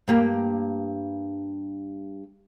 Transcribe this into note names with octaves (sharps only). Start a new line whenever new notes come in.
G2 A#3 G4